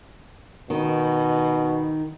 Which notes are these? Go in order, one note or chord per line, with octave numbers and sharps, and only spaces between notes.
B2 D#3